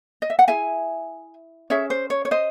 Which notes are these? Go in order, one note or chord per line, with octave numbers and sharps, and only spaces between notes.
D#5
E5
F#5
E4 G#4 E5 G#5
C#4 G#4 C#5 E5
C5
C#5
C#5
C5 D#5